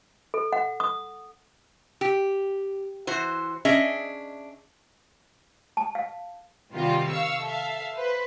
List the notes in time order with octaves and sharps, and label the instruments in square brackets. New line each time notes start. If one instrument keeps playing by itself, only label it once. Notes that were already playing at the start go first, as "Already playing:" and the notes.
[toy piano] A4
F#5
D#6
[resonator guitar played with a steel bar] G4
E3 F#4 C5
C#4 D4 G#4 D#5 E5
[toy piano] A5
F5
[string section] C3 D#3 G3 F4 F#4
F5 C#6 E6
A4 E5 F5
B4 C5